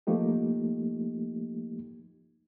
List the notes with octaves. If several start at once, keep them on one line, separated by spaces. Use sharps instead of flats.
F3 A3 A#3 D#4 G4